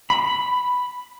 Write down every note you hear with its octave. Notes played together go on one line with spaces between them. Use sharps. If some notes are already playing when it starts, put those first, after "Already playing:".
B5